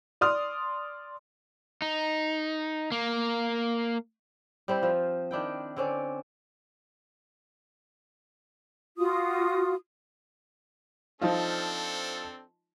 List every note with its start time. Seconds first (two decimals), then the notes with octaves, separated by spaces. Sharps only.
0.21 D5 C6 D#6 F6
1.82 D#4
2.92 A#3
4.68 G3 C4 E4 C5
4.82 F3 F4
5.31 D#3 D4 E4 G5
5.76 D3 C4 C#4 D5
8.98 F4 F#4 D#6
11.21 F3 C4 D4 D#4 F4 A4